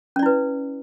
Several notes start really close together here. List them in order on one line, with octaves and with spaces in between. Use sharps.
C#4 D5 E4 B4